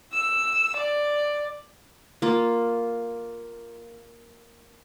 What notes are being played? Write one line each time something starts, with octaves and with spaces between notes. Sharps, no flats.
E6
D5
A#3 F4